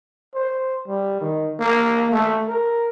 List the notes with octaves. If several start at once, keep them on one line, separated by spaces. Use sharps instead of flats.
C5
G3
D#3
A#3
A3
A#4